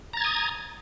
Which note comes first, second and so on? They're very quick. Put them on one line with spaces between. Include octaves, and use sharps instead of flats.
A#5 A6 G#6 D#6